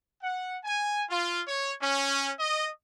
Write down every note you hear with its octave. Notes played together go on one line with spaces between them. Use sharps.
F#5
G#5
F4
C#5
C#4
D#5